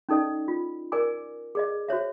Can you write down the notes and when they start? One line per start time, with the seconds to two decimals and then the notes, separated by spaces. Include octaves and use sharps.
0.09 C#4 D#4 A4 D5 D#5
0.48 F4
0.92 A#4 D5 G#5 D6
1.55 G#4 D5 D#5
1.88 F#4 C5 C#5 E5